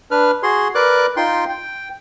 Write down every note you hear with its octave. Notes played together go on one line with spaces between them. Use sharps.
D4 B4 F6
F#4 G#4 C6
A#4 B4 D5 D6 F#6
D#4 F4 G5 C6
G5